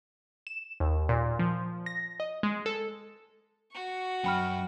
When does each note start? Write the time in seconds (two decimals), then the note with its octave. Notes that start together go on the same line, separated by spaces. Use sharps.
0.47 E7
0.80 D#2
1.09 A#2
1.39 F3
1.86 A#6
2.20 D#5
2.43 G#3
2.66 A4
3.73 F#4 C#6
4.24 F#2 G5 B5 F6